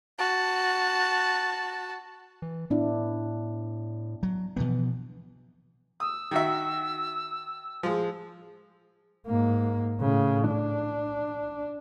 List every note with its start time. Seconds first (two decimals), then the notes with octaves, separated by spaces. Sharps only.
0.19 F#4 A5
2.42 E3
2.70 A2 B3 D4 E4
4.23 F#3
4.56 B2 E3 F3 B3
6.00 D#6 E6
6.31 D#3 F#4 E5
7.83 F3 G#3
9.26 G#2 A#3
10.01 A2 C#3
10.50 D4